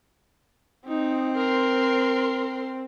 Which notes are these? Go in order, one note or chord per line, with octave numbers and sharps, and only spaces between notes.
C4 D#4
A#4 C6